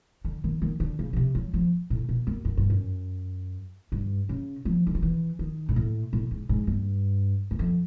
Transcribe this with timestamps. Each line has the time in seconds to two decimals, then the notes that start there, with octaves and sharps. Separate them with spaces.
0.25 D3
0.44 D#3
0.62 D#3
0.80 D3
0.99 C#3
1.13 C#3
1.16 C3
1.35 F#3
1.54 F3
1.90 A2
2.09 A#2
2.27 F#2
2.45 F#2
2.57 G2
2.70 F#2
3.92 G2
4.29 C#3
4.65 F3
4.87 D3
4.95 D#3
5.02 E3
5.39 D#3
5.69 G#2
5.76 A2
6.13 A2
6.31 G#2
6.49 G#2
6.67 G2
7.51 F#2
7.59 F2